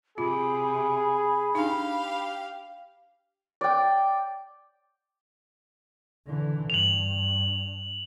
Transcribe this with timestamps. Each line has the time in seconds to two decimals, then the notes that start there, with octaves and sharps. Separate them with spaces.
0.18 C3 F4 G#4 B5
1.55 D4 D#4 G4 F5
3.61 D5 G5
6.26 D3 E3
6.70 G2 F7 F#7